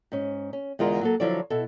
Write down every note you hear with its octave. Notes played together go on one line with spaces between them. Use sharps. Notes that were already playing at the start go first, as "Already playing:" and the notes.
G#2 C#4
C#4
E2 D3 G#3 F4 G#4 A#4
F#3 A#3 A4
D3 F3 F#3 E4 A4 D5
B2 E4 A4